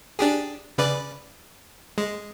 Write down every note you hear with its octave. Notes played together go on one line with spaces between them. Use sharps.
D4 G4 G#4
C#3 B4 D5
G#3